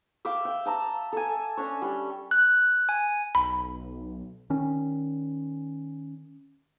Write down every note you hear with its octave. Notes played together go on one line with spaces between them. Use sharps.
E5 F5 G5 D6
G5
G5 A5 A#5 E6
A4 G#5
C#4 D4 C#5
G3 C#5
F#6
G#5
B1 B5
D#3 C#4